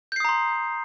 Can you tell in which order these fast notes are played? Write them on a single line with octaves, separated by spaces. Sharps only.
G6 C7 D#6 A#5 C6